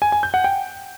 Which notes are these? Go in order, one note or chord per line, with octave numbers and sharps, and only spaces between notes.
G#5
G#5
G6
F#5
G5